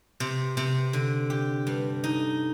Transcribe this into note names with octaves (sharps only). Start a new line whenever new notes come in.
C3
C3
D3
G4
G2
D#4